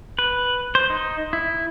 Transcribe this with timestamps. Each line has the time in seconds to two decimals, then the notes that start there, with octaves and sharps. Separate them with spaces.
0.19 B4
0.75 C5
0.90 D#4
1.33 E4